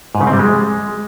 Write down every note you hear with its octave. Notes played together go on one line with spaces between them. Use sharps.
G#2
C#3
C4
G3
G#3